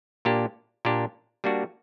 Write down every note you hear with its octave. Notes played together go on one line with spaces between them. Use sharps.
A#2 A#3 D4 G4
A#2 A#3 D4 G4
G3 A#3 D4 F#4